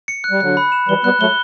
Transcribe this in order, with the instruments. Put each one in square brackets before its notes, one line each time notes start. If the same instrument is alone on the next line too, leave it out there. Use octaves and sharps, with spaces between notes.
[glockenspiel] C#7
F#6
[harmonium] G3
[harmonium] D3 F#3 [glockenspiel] F#6
[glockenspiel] B5
E7
[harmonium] E3 G3 [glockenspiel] G7
[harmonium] G3 B3 [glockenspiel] F#6
[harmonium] F#3 A3 [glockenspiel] G7